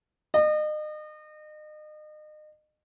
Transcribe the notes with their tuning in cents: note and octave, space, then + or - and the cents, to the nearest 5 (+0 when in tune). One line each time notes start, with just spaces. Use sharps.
D#5 -35